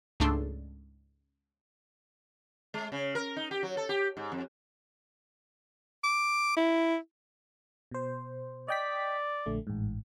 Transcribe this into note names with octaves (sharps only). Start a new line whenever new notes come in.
C#2 G#2 A3 D4 A4 C6
G#3
C#3
A#4
D#4
G4
F#3
A4
G4
G#2
F2
D6
E4
B2 C5
D5 D#5 G5 B6
A#1 D3 A3
A1 G#2